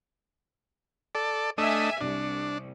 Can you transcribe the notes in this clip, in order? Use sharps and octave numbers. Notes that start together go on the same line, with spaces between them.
A4 D5
A3 D4 D#5 E5 G#5
C2 D4